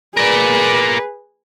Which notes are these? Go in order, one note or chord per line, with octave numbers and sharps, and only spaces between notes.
G#4 A#4 B4 D5